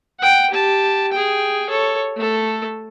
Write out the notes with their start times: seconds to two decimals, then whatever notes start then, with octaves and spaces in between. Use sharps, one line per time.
0.20 F#5 G5
0.50 G4 A5
1.12 G#4 G5
1.70 A4 C#5
2.16 A3 A4